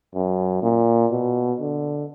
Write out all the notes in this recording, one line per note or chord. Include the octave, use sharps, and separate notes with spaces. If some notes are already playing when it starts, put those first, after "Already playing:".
F#2
A#2
B2
D3